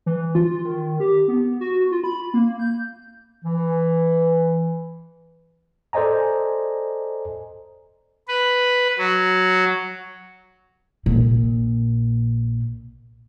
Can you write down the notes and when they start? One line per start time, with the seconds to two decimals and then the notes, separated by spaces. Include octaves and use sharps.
0.06 E3
0.35 F4
0.65 D#3
1.00 G4
1.28 B3
1.61 F#4
1.92 F4
2.04 B5
2.34 A#3
2.59 G6
3.44 E3
5.93 A4 C5 D5 D#5 G#5 A#5
8.28 B4
8.98 F#3
11.06 A#1 A#2